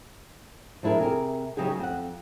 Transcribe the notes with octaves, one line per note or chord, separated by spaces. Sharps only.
F3 D4 E4 G#4 A#4
C3 G#4 A#4
C#3 F#3 G#3 D#4 G4 G#4
F2 F#5